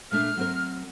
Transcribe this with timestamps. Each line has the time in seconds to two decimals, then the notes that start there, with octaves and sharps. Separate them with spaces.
0.11 A#2 A3 D4 F6
0.37 F#3 C4 A#4